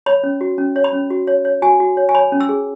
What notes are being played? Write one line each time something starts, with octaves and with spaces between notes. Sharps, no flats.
C#5 B5
C#4
F#4
C#4
C#5
B5
C#4
F#4
C#5
C#5
F#4 G#5
F#4
C#5
G#5
C#5 B5
C#4
E6
G#4